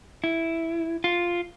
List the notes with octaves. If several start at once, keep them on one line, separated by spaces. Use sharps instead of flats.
E4
F4